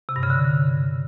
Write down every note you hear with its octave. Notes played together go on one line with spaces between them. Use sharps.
C3
G2
C#3
D3